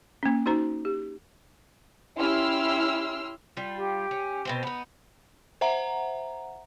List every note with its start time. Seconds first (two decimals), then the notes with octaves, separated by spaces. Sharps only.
0.23 A#3 C#4
0.46 D#4 F#4 C5 A#5
0.85 G4
2.18 C#4 E4 G4 C6 E6 F6
3.57 G3 F4
3.77 G4
4.11 C#4
4.45 B2 C4 C5
4.63 B3 D#4
5.61 C5 E5 F#5 A#5